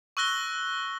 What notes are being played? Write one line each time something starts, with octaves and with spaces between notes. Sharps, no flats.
C#6 E6 F#6 A#6 G7